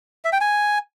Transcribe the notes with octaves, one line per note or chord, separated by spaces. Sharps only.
E5
G5
G#5